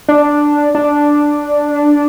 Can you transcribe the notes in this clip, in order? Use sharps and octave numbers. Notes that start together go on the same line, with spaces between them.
D4
D4